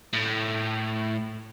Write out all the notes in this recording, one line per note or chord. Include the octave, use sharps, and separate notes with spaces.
A2